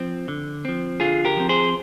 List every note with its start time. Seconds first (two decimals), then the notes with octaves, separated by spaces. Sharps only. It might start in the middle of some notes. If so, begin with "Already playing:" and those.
Already playing: F3 C4
0.28 D3
0.65 F3 C4
1.00 D3 F4 G#4
1.25 G4 A#4
1.37 F3 C4
1.49 G#4 C5